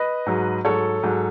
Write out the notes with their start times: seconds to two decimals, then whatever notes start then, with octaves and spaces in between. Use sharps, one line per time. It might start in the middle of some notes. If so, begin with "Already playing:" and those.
Already playing: B4 D#5
0.26 G#2 F#3
0.65 G#2 F#3 A4 C#5
1.03 G#2 F#3